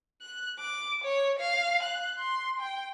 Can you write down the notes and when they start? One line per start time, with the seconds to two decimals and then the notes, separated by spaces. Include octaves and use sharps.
0.22 F#6
0.59 D6
1.04 C#5
1.39 F5
1.83 F#6
2.19 C6
2.60 G5